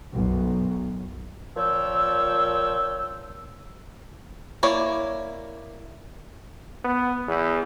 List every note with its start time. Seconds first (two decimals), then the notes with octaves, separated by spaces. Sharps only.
0.12 B1 F#2
1.57 A#2 F3 C#5 G5 E6
4.63 A#3 E4 C#5 D5
6.84 B3
7.27 E2